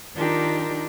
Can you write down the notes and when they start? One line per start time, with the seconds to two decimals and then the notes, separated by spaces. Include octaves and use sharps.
0.14 D#3 D4 D#4 F4 G4 A#4